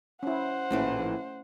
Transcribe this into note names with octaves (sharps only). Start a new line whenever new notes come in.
C#4 E4 C5 F#5
A#1 D#2 A2 E3 A3 C#4 E4